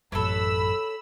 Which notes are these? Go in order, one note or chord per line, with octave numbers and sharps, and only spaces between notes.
A1 F#2 A4 B4 C#5 B5 E6